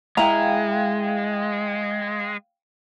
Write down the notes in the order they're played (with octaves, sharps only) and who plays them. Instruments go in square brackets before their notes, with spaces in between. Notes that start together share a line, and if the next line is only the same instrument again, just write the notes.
[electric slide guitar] G#3 [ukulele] E4 A#5 [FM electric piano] F5 G5